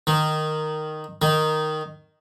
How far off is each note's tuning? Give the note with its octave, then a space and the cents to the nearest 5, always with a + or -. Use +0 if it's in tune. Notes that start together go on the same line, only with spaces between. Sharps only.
D#3 -10
D#3 -5